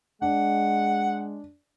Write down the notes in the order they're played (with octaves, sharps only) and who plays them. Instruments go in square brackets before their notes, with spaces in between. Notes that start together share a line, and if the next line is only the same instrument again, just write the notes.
[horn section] G#3 [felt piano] D4 [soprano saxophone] F#5